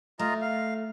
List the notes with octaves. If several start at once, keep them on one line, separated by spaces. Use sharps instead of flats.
A3 F4 D#5 A#5
F5